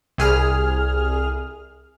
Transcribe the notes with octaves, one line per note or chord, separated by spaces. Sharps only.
C2 G#4 F6